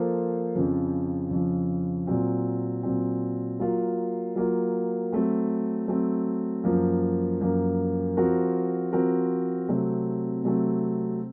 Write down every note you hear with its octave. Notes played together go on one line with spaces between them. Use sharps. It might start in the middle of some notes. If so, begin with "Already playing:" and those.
Already playing: F3 A#3 F4 A4 C5
F2 C#3 F3
F2 C#3 F3
A#2 F#3 C4
A#2 F#3 C4
F#3 A#3 F4
F#3 A#3 F4
F#3 A3 C4
F#3 A3 C4
F#2 F3 A#3
F#2 F3 A#3
F3 C4 F#4 A#4
F3 C4 F#4 A#4
C3 F#3 A3 C4
C3 F#3 A3 C4